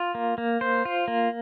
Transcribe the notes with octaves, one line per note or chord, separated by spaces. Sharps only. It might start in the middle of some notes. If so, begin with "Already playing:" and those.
Already playing: F4
A#3
A#3
C5
F4
A#3